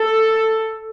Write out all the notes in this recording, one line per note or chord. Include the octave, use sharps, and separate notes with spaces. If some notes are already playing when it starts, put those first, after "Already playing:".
Already playing: A4